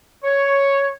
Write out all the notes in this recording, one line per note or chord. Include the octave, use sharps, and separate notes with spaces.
C#5